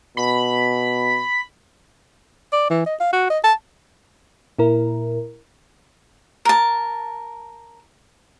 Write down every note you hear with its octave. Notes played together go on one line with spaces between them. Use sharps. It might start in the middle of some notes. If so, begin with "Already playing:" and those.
B2 B5
D5
E3
D#5
F5
F#4
D#5
A5
A#2 E4 A#4
A#4 A5